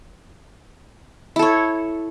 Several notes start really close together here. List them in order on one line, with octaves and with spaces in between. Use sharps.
E4 A4 C#5